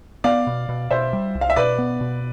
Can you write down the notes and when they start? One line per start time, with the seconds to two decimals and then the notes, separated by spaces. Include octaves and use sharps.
0.24 B3 D5 F5
0.47 B2
0.69 B2
0.91 B2 C5 E5
1.13 G3
1.35 C2
1.41 F5
1.50 E5
1.56 B2 B4 D5
1.78 B3
2.01 B2